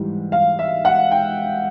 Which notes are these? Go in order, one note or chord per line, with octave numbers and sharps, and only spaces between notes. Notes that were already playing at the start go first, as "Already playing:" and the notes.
Already playing: G#2 E3 G3
F5
E5
F#5
G5